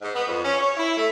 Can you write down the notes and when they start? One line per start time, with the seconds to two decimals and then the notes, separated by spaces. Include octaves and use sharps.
0.02 G#2
0.15 B3
0.28 F2
0.43 C#4
0.59 C#5
0.77 E4
0.98 A3